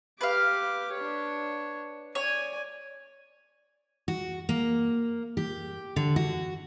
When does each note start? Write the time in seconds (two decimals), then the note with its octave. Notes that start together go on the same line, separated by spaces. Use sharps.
0.21 G4 B4 F5 D6
0.94 D4 C#5
2.15 C#5 D5 G#5
4.08 F#4
4.49 A#3
5.37 G4
5.96 D3
6.16 F#4